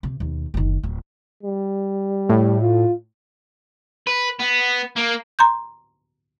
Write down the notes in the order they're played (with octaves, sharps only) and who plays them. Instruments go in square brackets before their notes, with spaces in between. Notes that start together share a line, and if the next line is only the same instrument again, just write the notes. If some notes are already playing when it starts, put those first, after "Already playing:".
[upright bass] C3
D#2 B2
F#1 D#3
D1
[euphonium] G3
[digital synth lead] A2
[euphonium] F4
[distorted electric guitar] B4
B3
A#3
[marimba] A#5 C6 G6